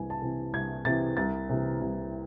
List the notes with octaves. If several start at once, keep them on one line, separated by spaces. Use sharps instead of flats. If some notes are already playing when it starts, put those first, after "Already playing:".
Already playing: C2 C3 E3 G#5
A5
C3 E3
C2 G#6
C3 E3 A6
C2 A6
C3 E3
C2